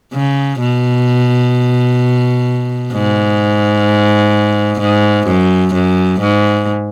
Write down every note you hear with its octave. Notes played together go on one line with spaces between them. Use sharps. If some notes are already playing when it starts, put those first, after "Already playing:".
C#3
B2
G#2
G#2
F#2
F#2
G#2